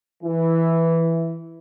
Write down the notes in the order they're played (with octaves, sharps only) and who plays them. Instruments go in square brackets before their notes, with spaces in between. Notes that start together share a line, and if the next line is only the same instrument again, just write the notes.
[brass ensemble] E3